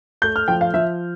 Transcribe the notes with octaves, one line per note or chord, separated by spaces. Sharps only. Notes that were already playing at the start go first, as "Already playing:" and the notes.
A3 G6
F6
F3 G5
F5
F3 E5